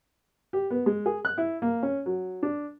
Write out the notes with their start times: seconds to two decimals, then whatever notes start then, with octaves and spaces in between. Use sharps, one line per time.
0.53 G4
0.70 B3
0.86 G#3
1.06 G#4
1.25 F#6
1.38 E4
1.62 A#3
1.83 C#4
2.06 F#3
2.43 D4